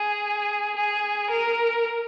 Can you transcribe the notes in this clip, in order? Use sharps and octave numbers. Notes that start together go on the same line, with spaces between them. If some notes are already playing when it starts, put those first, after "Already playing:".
Already playing: G#4
G#4
A#4